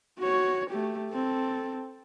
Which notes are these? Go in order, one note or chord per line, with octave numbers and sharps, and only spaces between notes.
F#4 C#5
A3 G4
C4 A4